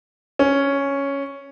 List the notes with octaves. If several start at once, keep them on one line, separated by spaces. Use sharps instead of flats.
C#4